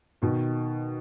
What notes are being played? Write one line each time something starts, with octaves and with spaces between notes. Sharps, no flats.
B2 D#3